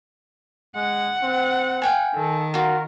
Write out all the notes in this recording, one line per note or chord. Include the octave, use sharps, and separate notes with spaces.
G#3 F#5
C4
F5 G5 G#5
D#3 A4
F4 F#4 A#4